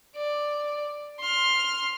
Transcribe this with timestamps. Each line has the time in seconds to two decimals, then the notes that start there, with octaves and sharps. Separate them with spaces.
0.16 D5
1.20 C6 F6